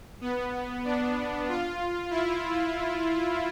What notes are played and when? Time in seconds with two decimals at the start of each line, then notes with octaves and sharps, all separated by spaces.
0.21 B3
0.85 D4
1.48 F4
2.11 E4